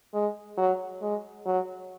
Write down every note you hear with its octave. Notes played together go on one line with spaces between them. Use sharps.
G#3
F#3
G#3
F#3